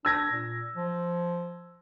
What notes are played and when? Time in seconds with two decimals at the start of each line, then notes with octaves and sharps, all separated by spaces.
0.05 D4 E6 G#6 A#6
0.31 A#2
0.76 F3